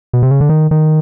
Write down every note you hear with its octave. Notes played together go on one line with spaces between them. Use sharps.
B2
C3
C#3
D3
D#3
D#3